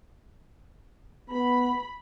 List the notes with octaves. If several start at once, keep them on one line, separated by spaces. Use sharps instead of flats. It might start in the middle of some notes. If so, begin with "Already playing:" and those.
B3 B5